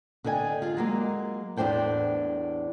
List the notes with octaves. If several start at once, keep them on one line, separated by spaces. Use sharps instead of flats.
D3 D#5 G5 G#5
F4 G#4
F#3 G#3 A#3
E2 A2 D4 C5 G5 A5